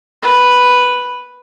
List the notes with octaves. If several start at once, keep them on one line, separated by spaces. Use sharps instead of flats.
B4